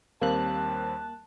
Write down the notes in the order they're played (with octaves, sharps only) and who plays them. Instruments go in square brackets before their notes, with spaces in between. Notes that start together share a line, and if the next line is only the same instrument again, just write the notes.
[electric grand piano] D#2 G3 C4 [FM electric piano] A#3 F#6 [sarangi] A5